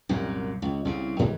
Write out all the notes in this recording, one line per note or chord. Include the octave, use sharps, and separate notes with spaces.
C2 F#2 A#2
C#2
C2 C#3
G#2 D#3 E3 G3